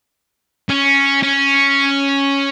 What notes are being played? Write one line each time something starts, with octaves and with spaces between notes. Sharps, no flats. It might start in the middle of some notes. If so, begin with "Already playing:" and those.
C#4
C#4